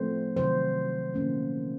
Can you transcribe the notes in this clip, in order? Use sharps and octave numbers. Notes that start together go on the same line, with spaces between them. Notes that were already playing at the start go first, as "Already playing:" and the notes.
Already playing: F3 A3 C4 C5
C3 D#3 F#3 A3 C5
D#3 A#3 C#4